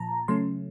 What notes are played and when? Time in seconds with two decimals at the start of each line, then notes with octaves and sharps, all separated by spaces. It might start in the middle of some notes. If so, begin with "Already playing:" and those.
Already playing: A#2 F3 A5 A#5
0.28 C#3 F#3 A3 C#4 C6